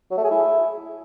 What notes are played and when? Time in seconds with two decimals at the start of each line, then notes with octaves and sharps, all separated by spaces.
0.11 F#3
0.17 A3
0.24 G#4
0.31 E4